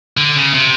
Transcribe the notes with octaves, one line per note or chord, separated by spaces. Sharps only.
D3
C#3
C3